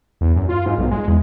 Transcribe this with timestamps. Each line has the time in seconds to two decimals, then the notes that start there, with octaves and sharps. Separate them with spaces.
0.21 E2
0.36 F#2
0.49 F4
0.66 G#2
0.78 B1
0.91 G#3
1.08 E2